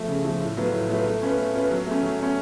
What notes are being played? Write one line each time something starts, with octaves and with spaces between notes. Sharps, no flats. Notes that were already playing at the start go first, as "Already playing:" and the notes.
Already playing: F3 A3
C#3
F3 A3
A2
F#3 A3 F4 B4
A2
F#3 A3 F4 B4
A3
C#4 F4 B4
A3
C#4 F4 B4
F#3
A3 C#4
F#3
A3 C#4